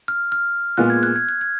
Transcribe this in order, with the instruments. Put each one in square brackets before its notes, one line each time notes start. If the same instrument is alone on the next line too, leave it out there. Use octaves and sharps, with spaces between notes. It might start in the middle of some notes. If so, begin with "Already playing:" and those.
[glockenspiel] F6
F6
[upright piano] A#2 G#3 B3 F4 G#4 [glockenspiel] F#6
[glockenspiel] G#6
F#6
G#6
F#6
G#6